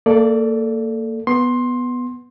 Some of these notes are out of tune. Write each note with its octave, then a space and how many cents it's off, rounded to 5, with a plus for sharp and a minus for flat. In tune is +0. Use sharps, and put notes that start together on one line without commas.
A#3 -25 A4 +0 D5 +5
B3 +0 C6 +15